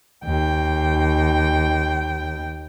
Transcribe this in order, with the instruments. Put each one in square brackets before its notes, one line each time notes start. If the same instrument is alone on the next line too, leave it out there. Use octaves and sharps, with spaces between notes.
[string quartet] D#2 G5